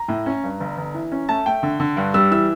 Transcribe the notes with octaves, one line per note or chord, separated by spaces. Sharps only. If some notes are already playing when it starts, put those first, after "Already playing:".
Already playing: A#5
A2
C#4
G2
G1
G1
E3
C#4
A3 A5
A3 G5
D3
D3
G2
G3 E6
E3 E6